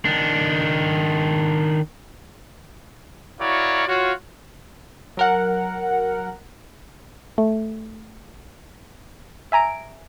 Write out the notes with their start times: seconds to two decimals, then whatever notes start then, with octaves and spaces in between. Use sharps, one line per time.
0.05 D#3 D4
3.39 E4 F#4 A#4 C#5 D5 F5
3.87 F4 F#4 C#5
5.17 F#3 A#4 F#5
7.38 A3
9.52 E5 G#5 A#5 D7